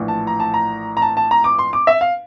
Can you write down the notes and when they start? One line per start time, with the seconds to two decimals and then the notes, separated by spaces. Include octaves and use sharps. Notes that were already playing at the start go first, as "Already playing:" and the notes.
Already playing: A#1 A2 E3
0.08 A5
0.27 A#5
0.40 A5
0.54 A#5
0.97 A#5
1.02 A5
1.17 A5
1.31 A#5
1.44 D6
1.59 C6
1.73 D6
1.87 E5
2.01 F5